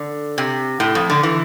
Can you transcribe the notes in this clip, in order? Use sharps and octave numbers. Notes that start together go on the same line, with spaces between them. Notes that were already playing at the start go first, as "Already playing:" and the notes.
Already playing: D3
C3
A2
F2
D3
E3